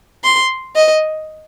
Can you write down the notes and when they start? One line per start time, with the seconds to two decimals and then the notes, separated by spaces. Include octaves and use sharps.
0.24 C6
0.76 D#5